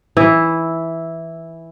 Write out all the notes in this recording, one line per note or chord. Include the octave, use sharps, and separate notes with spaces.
E3 E4